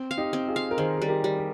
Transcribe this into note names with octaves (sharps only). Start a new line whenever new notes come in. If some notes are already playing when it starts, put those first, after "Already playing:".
Already playing: C4
F5
D#4 G4
C4
F4 G#4
F5
A#4
D#3 G#4 C5
G3 G#4
G4 A#4
G3
G4